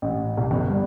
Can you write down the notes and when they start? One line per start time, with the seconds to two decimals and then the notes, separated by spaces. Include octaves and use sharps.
0.02 A1
0.37 C2
0.51 G1
0.68 G3